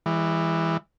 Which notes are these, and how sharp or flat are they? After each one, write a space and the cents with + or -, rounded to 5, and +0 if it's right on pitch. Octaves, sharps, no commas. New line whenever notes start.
E3 +0 G#3 -40